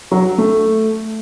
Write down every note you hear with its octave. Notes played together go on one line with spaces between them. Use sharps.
F#3
A3